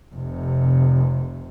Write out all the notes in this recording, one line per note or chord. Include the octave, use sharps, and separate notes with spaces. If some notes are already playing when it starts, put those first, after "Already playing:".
F1 C3